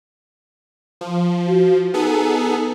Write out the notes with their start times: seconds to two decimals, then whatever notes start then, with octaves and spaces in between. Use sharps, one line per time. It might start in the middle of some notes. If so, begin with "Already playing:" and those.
1.01 F3
1.46 F#4
1.94 B3 D#4 G#4 A4